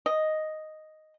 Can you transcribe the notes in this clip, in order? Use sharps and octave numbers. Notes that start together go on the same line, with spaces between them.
D#5